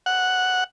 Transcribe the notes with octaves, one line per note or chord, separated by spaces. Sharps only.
F#5